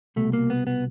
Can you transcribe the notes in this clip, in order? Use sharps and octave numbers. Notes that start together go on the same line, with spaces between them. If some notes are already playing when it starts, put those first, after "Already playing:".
C2 B2 A3
A#3
B3
B3